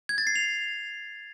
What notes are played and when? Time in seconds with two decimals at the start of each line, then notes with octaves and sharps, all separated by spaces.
0.09 G#6
0.18 A6
0.27 C7
0.36 F7